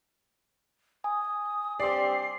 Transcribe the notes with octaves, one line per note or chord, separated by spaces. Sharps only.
G#5 D#6
G2 C4 G4 D5 C7